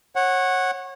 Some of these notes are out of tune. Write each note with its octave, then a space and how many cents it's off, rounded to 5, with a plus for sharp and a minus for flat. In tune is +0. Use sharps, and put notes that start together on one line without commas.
C#5 -25 F#5 +0